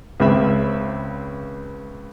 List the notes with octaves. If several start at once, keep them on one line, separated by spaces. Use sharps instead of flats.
C#2 C#3 C4 E5 B5